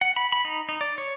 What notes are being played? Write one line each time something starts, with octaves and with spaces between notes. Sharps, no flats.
F#5
B5
B5
D#4
D#4
D5
C#5